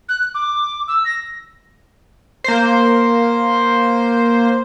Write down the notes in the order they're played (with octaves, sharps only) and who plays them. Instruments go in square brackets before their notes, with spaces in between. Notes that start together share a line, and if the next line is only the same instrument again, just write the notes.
[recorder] F#6
D6
E6
A#6
[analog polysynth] A#3 C5